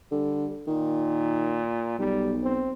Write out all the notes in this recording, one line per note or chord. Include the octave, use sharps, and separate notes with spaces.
D3 G3
A#2 D#3
B1 G3
C4